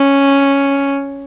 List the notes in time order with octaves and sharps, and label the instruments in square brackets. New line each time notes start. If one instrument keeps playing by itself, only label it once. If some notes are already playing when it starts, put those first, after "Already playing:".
Already playing: [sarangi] C#4